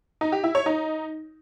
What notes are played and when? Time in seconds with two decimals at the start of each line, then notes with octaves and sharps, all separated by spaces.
0.21 D#4
0.32 G4
0.44 E4
0.55 C#5
0.66 D#4